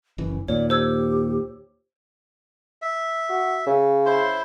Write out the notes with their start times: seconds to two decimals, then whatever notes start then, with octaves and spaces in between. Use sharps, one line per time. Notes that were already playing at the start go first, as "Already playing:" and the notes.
0.18 F#1 E3 C#4
0.48 D#2 A#2 C#5 D5
0.70 G4 C5 E6 G#6
2.82 E5
3.29 F#4
3.67 C#3
4.06 E4 C5 C6